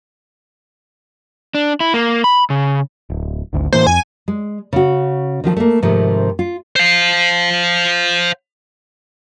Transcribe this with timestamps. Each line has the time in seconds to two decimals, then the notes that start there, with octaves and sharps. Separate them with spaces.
1.55 D4
1.80 E4
1.94 A#3
2.24 B5
2.50 C#3
3.10 D1
3.53 G#1 D2
3.73 A2 E3 A#3 C5
3.87 F2 G#5
4.28 G#3
4.73 C#3 F#4
5.44 D#3 F3 G4 A4
5.57 A3 A#3
5.82 G#2 C3 D#3 F3 A3
6.39 F4
6.76 C5 F5